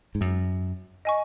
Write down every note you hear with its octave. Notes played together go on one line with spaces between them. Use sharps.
G#2
F#2
D#5 G#5 C#6